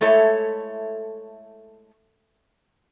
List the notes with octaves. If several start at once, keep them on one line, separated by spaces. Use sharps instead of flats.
G#3 A3 E4 A4 C#5 E5